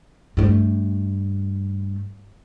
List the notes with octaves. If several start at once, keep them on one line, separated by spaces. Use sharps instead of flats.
G2 A3